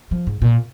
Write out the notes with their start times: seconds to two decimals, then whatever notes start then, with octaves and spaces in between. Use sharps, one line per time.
0.11 F3
0.27 G#2
0.42 A#2